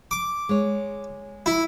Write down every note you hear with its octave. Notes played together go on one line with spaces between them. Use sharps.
D6
G#3 C#5
E4